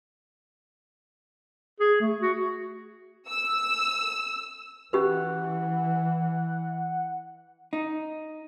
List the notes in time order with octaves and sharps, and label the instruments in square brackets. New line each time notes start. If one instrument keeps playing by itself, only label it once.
[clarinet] G#4
A3
F#4
[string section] E6
[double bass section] E3 [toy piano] C#4 G4 B4 [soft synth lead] F#5
[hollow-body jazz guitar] D#4